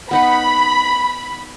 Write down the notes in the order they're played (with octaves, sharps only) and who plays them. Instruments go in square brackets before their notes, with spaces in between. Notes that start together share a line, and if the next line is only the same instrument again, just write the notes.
[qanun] B3 D#4 F#5 [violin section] B5